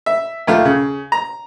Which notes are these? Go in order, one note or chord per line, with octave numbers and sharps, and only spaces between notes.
E5
D#2 A3 F4
C#3
A#5